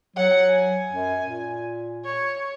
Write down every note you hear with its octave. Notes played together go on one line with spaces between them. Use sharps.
F#3 F#5
G#5
F#2
A#2
C#5